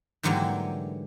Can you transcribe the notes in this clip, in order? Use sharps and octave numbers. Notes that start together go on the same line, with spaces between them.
G#2 D3 E3 F#3 G3 A#3